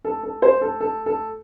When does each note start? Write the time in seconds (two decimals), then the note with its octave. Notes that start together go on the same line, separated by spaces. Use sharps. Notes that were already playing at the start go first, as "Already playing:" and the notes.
0.05 A4
0.23 A4
0.42 C5
0.61 A4
0.80 A4
1.06 A4